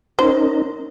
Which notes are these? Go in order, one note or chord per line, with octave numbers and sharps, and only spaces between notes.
C#4 D#4 A#4 C5